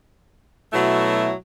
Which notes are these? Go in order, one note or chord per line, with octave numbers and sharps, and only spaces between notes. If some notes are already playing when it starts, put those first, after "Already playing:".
B2 F#3 A3 E4